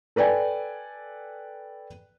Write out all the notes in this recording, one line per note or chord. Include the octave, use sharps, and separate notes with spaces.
A4 B4 D5 G5 G#5